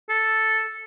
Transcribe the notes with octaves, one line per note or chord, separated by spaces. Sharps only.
A4